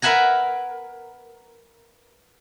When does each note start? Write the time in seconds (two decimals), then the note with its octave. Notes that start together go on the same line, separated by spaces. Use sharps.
0.02 A#4 B4 E5 F#5 G#5 A#5